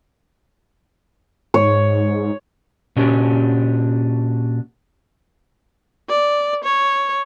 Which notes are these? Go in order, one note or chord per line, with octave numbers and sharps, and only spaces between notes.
G#2 C#5
A#2 C#4 D4 F#4 G4
D5
C#5